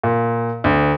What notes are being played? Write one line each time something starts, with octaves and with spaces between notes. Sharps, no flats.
A#2
D2